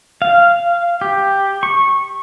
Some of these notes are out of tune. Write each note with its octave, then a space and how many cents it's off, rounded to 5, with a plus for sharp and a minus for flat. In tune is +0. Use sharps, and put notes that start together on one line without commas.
F5 -15
G4 +5
C#6 -15